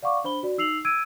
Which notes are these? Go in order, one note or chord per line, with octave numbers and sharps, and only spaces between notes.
D5 F5 F#5 C#6 D6
D4 C5 B5 G7
F#4 D5
D#4 E6 C7 F7 F#7
E6 G#6 D7 D#7